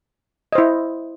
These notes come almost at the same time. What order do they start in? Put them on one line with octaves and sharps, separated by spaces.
D#5 C5 E4